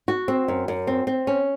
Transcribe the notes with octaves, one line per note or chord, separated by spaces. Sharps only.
F#4
C4
F#2
F#2
C4
C4
C#4